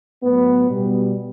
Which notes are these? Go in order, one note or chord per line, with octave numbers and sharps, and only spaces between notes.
A2 F#3 B3 B4
B2 G3